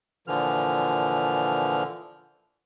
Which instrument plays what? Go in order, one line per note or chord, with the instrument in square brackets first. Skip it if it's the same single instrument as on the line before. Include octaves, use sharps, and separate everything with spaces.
[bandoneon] A#2 D3 E3 F3 F6